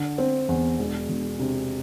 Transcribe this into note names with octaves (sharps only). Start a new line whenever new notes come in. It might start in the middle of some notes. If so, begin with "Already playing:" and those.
Already playing: D3
C4
E2
E1
E1
C3